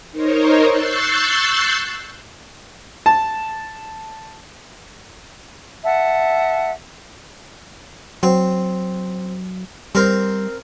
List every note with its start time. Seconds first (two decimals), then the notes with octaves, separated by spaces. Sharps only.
0.12 D#4 A#4 C5 C#5
0.67 C#6 E6 F#6 G6 A6 C7
3.06 A5
5.84 E5 F#5 A5
8.23 F#3 C4
9.95 G3 C4 A#4 C5